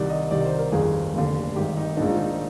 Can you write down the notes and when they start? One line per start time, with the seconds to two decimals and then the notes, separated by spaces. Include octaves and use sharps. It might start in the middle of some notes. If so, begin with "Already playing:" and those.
Already playing: C2 C3 D#3 D5
0.09 D#5
0.31 C2 C3 D#3 D5
0.45 C5
0.59 A#4
0.72 G1 F2 D#3 G#4
1.14 F1 D#2 D3
1.56 G#1 G2 D#3 G4
1.77 D#4
1.97 A#1 G#2 D#3 D4
2.10 F4
2.18 D#4